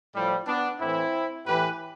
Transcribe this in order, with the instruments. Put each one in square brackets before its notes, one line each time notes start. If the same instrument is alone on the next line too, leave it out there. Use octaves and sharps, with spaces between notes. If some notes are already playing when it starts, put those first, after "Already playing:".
[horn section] A2 F3 G3
B3 D4
A2 E3 C4 E4
A2 E3 G4 B4